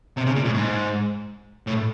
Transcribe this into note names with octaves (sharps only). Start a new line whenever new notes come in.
C3
C#3
A#2
A2
G#2
A2